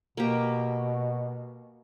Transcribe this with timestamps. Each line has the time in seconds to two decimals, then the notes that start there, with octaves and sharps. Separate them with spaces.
0.17 B2 A#3 G4